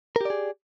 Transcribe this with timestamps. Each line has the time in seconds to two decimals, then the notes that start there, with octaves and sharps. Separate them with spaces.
0.16 A#4
0.21 G4
0.25 D5
0.30 G#4